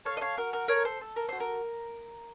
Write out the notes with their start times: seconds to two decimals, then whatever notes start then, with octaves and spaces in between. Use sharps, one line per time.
0.05 A4 C#5 F5
0.17 D#5
0.21 C#5 F5
0.37 F#4 A#4
0.53 A#4
0.68 A4 A#4 C#5
0.85 A4 C5
1.01 A4
1.16 A#4
1.29 F#4 C5
1.40 A#4